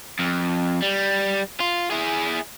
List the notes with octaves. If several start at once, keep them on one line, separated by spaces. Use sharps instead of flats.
F2
G3
F4
E4 G#4